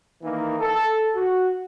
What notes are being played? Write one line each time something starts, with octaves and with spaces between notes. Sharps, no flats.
D#3 E3 A#3 D#4
A4
F#4